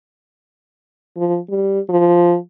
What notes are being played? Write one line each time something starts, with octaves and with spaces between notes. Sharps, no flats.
F3
G3
F3